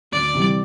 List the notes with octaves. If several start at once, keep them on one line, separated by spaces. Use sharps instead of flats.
D2 D5
C3 E3 G3